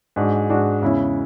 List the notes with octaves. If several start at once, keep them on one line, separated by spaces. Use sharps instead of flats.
G#2 G#3 D4 F#4
G#2 G#3 D4 F#4
E2 C#3 G#3 C#4 E4